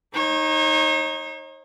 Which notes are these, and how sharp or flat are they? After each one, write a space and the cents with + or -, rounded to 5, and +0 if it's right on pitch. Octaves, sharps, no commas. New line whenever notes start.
D#4 +0 C#5 -40